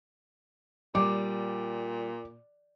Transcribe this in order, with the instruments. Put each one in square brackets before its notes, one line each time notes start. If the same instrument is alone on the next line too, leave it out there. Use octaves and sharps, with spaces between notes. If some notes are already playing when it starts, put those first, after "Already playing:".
[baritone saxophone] A#2 [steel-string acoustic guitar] G3 [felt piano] D6